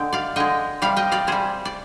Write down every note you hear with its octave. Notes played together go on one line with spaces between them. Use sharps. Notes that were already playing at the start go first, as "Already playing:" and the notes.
Already playing: D3 G#3 G5
D5 F5
D3 G#3 D#5 G5
C3 G3 D5 F5
D#5 G5
D5 F5
C3 G3 G#4 C5
D5